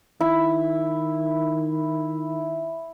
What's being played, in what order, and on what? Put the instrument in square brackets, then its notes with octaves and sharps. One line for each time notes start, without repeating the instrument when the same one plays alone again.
[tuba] D#3 [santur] E4